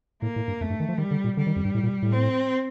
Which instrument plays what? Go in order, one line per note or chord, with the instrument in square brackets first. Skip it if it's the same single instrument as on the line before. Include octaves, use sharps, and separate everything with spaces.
[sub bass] A2 [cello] A#3
[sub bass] A2
G2
[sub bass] F2 [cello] A3
[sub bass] G2
D#3
F3
[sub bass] D#3 [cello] G3
[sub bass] D3
A#2
[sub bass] D3 [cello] G3
[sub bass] D#3
F2
G2
A2
A#2
A2
[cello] C4